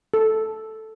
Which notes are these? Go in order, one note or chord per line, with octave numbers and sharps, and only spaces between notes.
A4